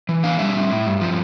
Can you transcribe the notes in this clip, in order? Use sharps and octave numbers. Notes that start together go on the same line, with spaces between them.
E3
D4 F5
G3 E5
A2
A2
G2
F3